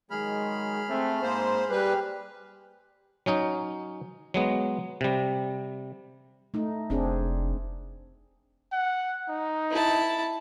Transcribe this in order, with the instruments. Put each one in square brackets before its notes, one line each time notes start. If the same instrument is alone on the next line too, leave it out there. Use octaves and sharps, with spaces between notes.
[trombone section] D#3 F#3 G#3 [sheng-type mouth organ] G#4 B5 F6
[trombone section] A3 C4
[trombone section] G#2 A#3 [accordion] C5
[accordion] G3 B4 [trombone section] G4
[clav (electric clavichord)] F#3 C#4 D#4
F#3 G#3 B3
C3 G3
[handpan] A3 D#4
[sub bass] F1 [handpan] C4 D4 G#4
[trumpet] F#5
D#4
[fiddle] E4 A5